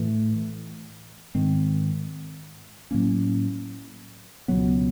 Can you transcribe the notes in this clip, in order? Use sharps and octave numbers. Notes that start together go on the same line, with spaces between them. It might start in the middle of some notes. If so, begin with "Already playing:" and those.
Already playing: A2 E3 A3
G#2 D#3 G#3 C4
A2 F#3 A#3 C#4
C#2 B2 F#3 B3